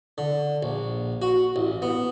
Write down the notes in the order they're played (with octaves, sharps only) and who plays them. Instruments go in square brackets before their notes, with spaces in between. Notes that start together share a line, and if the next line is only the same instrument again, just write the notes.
[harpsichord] D3
A#1
F#4
A1
B3